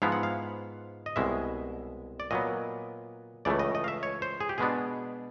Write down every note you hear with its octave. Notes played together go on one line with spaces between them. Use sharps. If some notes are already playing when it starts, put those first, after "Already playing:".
G#2 F3 G#3 B3 E4 F5
F#5
F5
D#5
C2 B2 G#3 E5
D5
A#2 F#3 B3 D#5
C#2 C#3 E3 A3 D5
D#5
D#5
F5
E5
C#5
C5
G#4
G4
B2 G#3 B3 D4 G#4